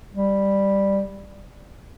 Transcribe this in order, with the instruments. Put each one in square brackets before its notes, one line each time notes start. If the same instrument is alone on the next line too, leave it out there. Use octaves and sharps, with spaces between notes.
[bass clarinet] G3